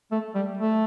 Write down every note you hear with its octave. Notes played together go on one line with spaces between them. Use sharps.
A3
G3
A3